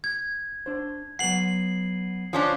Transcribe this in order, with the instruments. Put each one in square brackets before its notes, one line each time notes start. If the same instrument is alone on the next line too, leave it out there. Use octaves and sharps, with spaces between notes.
[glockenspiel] G#6
[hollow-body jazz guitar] D4 C5
[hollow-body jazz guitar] F#3 B3 F#5 [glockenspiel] C7 F#7
[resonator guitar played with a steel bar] F3 C#4 D4